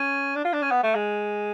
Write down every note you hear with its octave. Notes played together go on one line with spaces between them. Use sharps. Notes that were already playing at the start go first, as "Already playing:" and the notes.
Already playing: C#4
D4
F4
D4
C#4
B3
A3
G#3